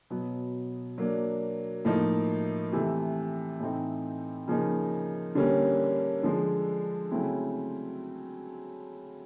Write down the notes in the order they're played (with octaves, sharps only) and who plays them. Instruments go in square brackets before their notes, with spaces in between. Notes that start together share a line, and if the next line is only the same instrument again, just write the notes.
[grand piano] B2 F#3 B3
F#3 A#3 D4
A2 F3 A#3 D#4
C3 E3 A3
A2 E3 A3 C4 D#4
C#3 F3 A#3 D#4
D3 G3 A#3 C#4
D3 F3 G#3
C#3 F#3 A3 C4 E4